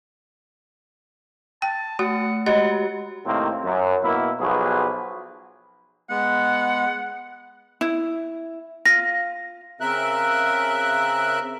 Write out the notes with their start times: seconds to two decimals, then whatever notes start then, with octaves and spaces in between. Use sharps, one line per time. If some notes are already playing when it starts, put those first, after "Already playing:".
1.62 G5 A5
1.99 A3 F#4 F#5
2.46 G#3 F#4 G4 D#5 F#5
3.26 A2 C3 D#3 A#3 C4
3.63 F#2
4.03 B2 A#3 E4
4.40 B1 F3 F#4 G#4 B4
6.10 G#3 B3 F#5
7.81 E4
8.85 F4 A#6
9.81 C#3 C4 A#4 E5 F#6